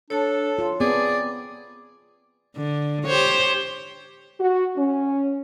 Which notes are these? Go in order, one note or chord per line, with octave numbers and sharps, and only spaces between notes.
D4 A4 C#5 A5
F4
B3 C4 G#4 D5 D6
D3
G4 C5 C#5
F#4
C#4